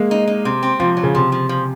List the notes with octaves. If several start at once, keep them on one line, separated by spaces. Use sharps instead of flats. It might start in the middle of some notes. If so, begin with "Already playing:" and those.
Already playing: G#3 A#3
D#4
D#4
C3
C4
C3 F3
F#3
C#3
C3 F3
F3
F3